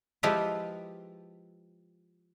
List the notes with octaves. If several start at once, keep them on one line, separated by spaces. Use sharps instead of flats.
F3 G#3 E4 F4 G4 B4